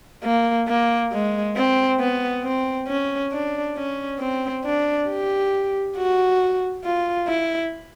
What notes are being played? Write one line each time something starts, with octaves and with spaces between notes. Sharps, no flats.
A#3
A#3
G#3
C4
B3
C4
C#4
D4
C#4
C4
D4
G4
F#4
F4
E4